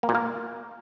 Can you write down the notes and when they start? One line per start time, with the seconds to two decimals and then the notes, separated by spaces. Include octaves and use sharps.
0.03 A#3
0.09 A#2
0.15 A#3